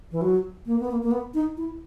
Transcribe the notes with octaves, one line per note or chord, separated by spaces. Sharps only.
E3
F#3
A#3
B3
A#3
A#3
B3
D#4
E4